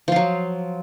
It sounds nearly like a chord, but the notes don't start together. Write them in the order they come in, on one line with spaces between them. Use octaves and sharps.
F3 F4 F#3